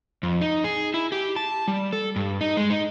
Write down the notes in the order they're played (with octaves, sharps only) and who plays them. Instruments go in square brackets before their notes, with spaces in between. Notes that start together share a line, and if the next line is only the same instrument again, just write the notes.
[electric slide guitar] F2
D#4
G#4
E4
G4
A5
G3
A4
G2
D#4
G#3
D#4